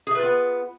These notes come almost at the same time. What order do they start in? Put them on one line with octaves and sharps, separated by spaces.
G#4 E5 B4 F4 B3